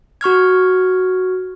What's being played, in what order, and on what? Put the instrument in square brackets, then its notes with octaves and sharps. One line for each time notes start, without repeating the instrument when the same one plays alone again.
[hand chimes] F#4 C#6 F6 G#6